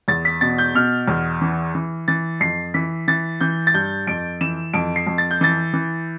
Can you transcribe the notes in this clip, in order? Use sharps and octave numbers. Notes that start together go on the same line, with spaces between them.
E2 A6
B6
B2 A6
G6
B2 F6
E2
E3
E3
E3 A6
F2 C7
E3 B6
E3 A6
E3 G6
A6
G2 G6
F2 D7
E3 E7
F2 D7
C7
F2
A6
G6
E3 A6
E3